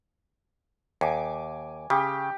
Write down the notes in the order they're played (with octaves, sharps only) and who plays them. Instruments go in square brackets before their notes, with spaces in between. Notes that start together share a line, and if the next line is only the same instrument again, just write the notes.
[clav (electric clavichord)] D#2 [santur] G#5 D6
[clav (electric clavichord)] C#3 [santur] G4